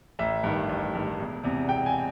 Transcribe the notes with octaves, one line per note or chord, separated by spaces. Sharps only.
A1 E5
G2 D#3
A1
G2 D#3
E1
E2 C3
E1 G5
G#5